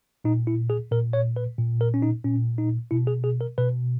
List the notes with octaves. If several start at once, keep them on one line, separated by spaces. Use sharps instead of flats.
A#2 D#4
E4
G#4
A#2 A#4
C#5
B4
A#2
A#4
C#4
D#4
A#2 C#4
D#4
B2 E4
G#4
G#4
A#4
B2 B4